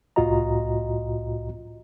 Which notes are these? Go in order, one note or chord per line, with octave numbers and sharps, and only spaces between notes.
C2 A2 F4 F#4 D#5 A#5